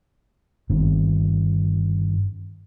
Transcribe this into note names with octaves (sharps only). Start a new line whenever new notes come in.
G1 G2 D#3 C4